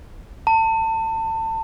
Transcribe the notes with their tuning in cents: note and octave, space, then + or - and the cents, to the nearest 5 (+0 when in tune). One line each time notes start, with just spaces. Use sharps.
A5 +30